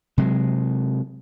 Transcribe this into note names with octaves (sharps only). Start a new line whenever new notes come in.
C3 F#3 G#3